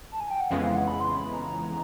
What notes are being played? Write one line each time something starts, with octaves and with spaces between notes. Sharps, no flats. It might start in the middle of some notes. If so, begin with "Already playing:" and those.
A5
G#5
G5
F#5
F2 C#3 E3 G#3 B3 F5
F5
F#5
B5
C6
B5
A#5